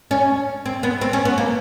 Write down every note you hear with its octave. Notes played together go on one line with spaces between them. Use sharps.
C#4
C4
B3
C4
C#4
B3
A#3